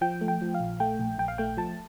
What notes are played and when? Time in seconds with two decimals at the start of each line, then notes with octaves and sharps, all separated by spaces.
0.01 F3 G5
0.21 A3
0.28 G5
0.41 F3
0.54 F5
0.60 A#1
0.80 A3 G5
0.99 A#1
1.18 A#1 G5
1.28 F5
1.38 A3 G5
1.57 F3 A5